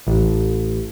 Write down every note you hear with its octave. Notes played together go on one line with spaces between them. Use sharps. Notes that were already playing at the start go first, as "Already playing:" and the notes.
A1